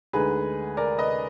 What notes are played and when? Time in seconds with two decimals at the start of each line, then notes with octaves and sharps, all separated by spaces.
0.13 D2 D3 G#3 D#4 G#4 B4
0.77 A#4 D5
0.98 B4 D#5